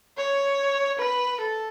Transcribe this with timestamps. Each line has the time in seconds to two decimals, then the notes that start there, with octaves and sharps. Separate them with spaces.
0.17 C#5
0.99 B4
1.40 A4